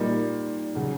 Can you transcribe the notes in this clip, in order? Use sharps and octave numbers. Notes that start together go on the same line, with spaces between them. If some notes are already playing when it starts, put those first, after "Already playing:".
Already playing: A#2 G3 A#3 D#4
C#3 F#3